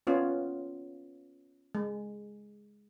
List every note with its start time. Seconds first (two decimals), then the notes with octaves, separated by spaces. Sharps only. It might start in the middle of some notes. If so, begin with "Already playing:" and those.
0.07 B3 C#4 F4
1.75 G#3